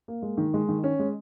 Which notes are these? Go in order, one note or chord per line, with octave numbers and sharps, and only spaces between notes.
A#3
G#3
D#3
G#3
D#3
C#4
G#3